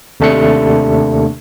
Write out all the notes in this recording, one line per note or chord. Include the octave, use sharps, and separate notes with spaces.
D#2 C3 A3 D4 A4 C#7